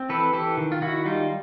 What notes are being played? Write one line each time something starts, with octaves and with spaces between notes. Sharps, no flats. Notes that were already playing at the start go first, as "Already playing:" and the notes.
Already playing: C4
E3 A4 B4
E3 G4 A4
D#3
F4
D#3 E4 F#4
G3 D#4 F4